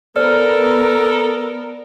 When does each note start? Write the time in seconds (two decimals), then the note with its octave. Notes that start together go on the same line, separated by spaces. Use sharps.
0.16 B3 A4 A#4 C5 D5 F6